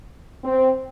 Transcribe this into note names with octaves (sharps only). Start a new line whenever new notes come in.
C4